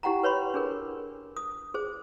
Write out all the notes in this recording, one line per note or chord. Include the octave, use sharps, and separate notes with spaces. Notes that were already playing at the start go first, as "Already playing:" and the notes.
E4 G4 F#5 G5 A#5
B4 C#5 B5 C6
D4 G#4 A#4
D#6
G#4 C5